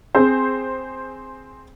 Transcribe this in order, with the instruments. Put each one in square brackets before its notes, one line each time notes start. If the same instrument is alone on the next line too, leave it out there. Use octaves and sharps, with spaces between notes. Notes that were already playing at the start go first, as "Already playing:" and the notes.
[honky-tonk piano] C4 G#4 C5